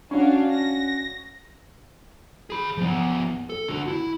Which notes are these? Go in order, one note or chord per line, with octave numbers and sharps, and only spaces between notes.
C#4 D4 F#4 F5
A#6
G#4 B5
F3 B3
A4
D3 F#4
E4